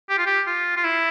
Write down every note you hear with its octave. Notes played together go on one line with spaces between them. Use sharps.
G4
F4
G4
F4
F4
E4